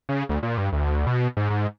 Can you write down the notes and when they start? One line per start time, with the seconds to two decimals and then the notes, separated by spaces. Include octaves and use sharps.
0.09 C#3
0.29 D2
0.43 A#2
0.58 G2
0.72 D2
1.07 B2
1.37 G#2
1.50 G#2